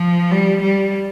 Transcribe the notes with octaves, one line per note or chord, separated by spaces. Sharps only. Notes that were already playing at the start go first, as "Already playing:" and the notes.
Already playing: F3
G3
G3